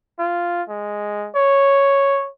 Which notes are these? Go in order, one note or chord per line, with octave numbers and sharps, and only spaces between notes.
F4
G#3
C#5